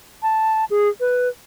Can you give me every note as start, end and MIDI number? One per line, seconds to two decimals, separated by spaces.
0.23 0.65 81
0.70 0.89 68
1.00 1.29 71